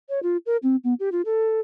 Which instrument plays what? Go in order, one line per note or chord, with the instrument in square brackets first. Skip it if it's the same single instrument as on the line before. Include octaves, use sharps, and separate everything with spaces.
[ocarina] C#5
F4
A#4
C4
B3
G4
F4
A4